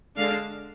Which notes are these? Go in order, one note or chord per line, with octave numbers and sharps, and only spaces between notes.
D3 G#3 D4 F5